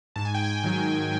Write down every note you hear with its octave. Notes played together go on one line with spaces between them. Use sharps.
G#2 A5
G#5
G5
G#5
D#3 F#3